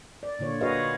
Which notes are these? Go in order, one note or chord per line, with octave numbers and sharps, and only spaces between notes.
D5
A#2 D3 F4 C#5
F#4 G#4 B4 C#5 D#5 F5